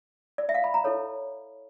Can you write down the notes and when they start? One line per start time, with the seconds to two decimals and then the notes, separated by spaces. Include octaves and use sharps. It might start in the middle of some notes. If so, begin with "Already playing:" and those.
0.38 D5
0.49 E5
0.55 F5
0.64 B5
0.74 A#5
0.84 E4 A4 C#5